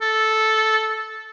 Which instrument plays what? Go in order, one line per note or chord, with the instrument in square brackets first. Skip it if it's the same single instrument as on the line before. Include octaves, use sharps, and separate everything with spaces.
[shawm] A4